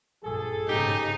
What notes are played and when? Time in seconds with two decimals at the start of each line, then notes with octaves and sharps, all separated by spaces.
0.24 A#1 G2 G#4 A4
0.69 G#2 C#3 D#4 G4